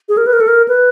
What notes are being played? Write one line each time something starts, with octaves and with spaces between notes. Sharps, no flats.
G#4
A#4
B4
A#4
A4
A#4
B4